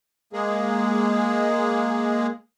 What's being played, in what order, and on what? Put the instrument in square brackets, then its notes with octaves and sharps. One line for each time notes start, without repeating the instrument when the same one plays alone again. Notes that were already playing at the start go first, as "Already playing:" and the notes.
[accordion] G#3 A#3 G#4